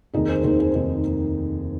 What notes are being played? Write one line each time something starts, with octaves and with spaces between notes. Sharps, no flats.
F1 D#2 D#3 D#4 G#4
G#4 C5
F1 D#2 D#3 G#4 C5
G#4 C5
F1 D#2 D#3